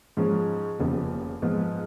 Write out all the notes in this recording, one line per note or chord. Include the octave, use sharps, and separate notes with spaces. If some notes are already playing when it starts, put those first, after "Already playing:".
G#2 F3 G#3 C#4
F1 D#2 C#3 F3 B3
G#2 F3 G#3 B3 F4